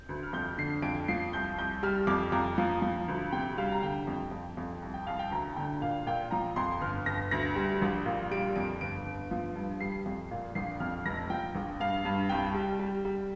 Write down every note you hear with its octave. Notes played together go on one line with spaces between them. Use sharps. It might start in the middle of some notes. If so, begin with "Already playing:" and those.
Already playing: G6
D2
F6
F2 G6
D3 C7
F2 D7
F3 C7
C2 G6
C2 G6
G3 F6
F2 D6
F2 A#5
F3
F3
D2
C3 G5
G3 F5
A#5
D3 G5
F2
F2
F2
C2
G5
C2 F5
G5
D2 A#5
D3 G5
A#2 F5
A#2 G5
F3 A#5
F2 C6
G1 F6
G1 A#6
D2 A#6
G3
A#1
A#2
G3 D7
F2 D7
G1 D7
G1
F3
G2
G3 C7
F2
A#2
A#1 C7
F2 F6
F1 A#6
F3 G5
A#1
G2 F5
G2
C2 G5
G3
G3
G3